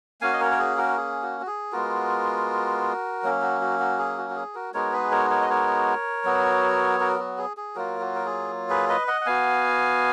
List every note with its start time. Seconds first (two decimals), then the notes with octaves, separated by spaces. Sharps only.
0.21 A#3 C#4 F#4 F5 G#5
0.33 D#5
0.41 A#4 C#5
0.51 A#4
0.59 G#4
0.78 F#4 A#4
0.97 G#4
1.22 F#4
1.41 F#4
1.47 G#4
1.72 G#3 B3 F4 F#4 A#4
3.23 F#3 A#3 C#4
3.42 F#4
3.61 F#4
3.79 F#4
3.98 G#4
4.18 F#4
4.30 F#4
4.36 G#4
4.55 F#4 A#4
4.74 G#3 B3 D#4 F#4 A#4 C#5
4.93 G#4 B4
5.12 A#4 C#5
5.30 A#4 C#5
5.41 D#5
5.50 A#4 C#5
6.25 F#3 B3 F#4
7.00 F#4 A#4
7.19 F#4
7.38 G#4
7.57 G#4
7.75 F#3 A#3 F4 F#4 A#4
8.01 F#4
8.15 A#4
8.25 G#4
8.70 G#4 B4
8.89 B4 D#5
9.07 D#5 F#5
9.21 F#5
9.26 B3 F#4 F5 G#5